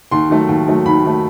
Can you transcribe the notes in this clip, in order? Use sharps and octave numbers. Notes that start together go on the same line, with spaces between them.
D#2 C6
D#3 F#3 A3
D#2
D#3 F#3 A3
D#2 B5
D#3 F#3 A3